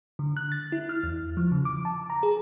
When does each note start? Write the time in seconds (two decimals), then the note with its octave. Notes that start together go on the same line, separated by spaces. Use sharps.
0.19 D3
0.37 F#6
0.52 A6
0.72 E4
0.89 F6
1.03 E2
1.37 F3
1.52 C#3
1.65 D6
1.85 A5
2.10 A#5
2.23 G#4